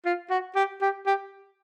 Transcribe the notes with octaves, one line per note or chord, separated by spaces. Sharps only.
F4
F#4
G4
G4
G4